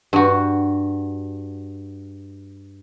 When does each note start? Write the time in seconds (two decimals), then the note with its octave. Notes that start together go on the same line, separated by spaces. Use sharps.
0.13 G2 F#4